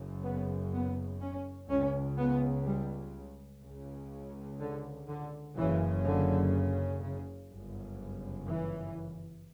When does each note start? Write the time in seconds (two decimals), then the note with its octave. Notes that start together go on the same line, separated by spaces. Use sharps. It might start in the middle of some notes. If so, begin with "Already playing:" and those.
Already playing: F#1 F#2 C#3
0.24 B3
0.73 B3
1.21 C#4
1.69 C#2 C#3 C#4
2.18 B3
2.66 G3
3.63 C#2 C#3
4.60 D3
5.08 D3
5.57 F#1 F#2 C#3 E3
6.05 D3
7.02 C#3
7.50 G1 F#2 C#3
8.47 E3